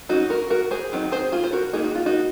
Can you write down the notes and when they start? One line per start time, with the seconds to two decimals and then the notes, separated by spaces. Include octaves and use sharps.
0.09 F#3 C#4 D#4 F#4
0.30 F#4 A#4
0.50 F#4 A#4
0.71 G#4 C5
0.92 D#3 F#3 C4 D#4
1.12 G#4 C5
1.32 F4 G#4
1.44 C5
1.53 F#4 A#4
1.73 D#3 A#3 D#4 G#4
1.84 F#4
1.95 F4
2.06 D#4 F#4